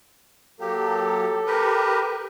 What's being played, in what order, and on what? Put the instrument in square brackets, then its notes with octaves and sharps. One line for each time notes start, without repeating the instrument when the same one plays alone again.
[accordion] F#3 A#3 G4 [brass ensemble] A4
[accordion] G4 A#4 B4